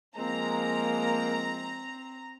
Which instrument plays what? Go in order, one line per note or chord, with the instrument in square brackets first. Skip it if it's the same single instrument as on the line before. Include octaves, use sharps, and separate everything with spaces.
[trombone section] F3 G#3 [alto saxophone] A#3 [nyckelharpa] C4 [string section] A#5